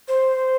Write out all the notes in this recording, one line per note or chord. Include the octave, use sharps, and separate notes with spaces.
C5